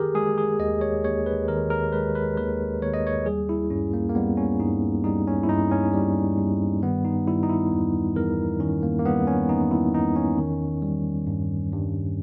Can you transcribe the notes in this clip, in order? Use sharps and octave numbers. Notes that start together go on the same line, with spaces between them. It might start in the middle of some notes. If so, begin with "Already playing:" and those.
Already playing: D#3 G4 G#4 A#4
G#3 G#4
G#4
D#2 D#5
C#5
D#2 C#5
B4
D#3 A#4
A#4
G#3 B4
B4
D#2 B4
D#2 C#5
D#5
C#5
G3 G#4
E4
G2 C#4
A#3
A#3
G3 B3
C#4
G2 D#4
G3 D#4
C#4
E4
G2 D#4
C#4
G3
G2
D#3 B3
D#4
G3 E4
D#4
E4
E2
E2 A#4
D#3 C#4
A#3
A#3
G3 B3
C#4
E2 D#4
E4
E2 D#4
C#4
D#3
G3
G2
G2